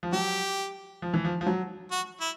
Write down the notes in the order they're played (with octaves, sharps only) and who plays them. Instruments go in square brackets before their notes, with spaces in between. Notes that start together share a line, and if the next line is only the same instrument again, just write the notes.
[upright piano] F3
[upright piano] F#3 [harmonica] G4
[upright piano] F3
E3
F3
F3
F#3
[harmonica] F#4
E4